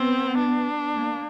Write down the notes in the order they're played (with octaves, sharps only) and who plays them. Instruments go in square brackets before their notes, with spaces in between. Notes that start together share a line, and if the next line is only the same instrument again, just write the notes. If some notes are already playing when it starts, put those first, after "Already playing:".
Already playing: [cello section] B3 [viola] C4
[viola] D4
[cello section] A#3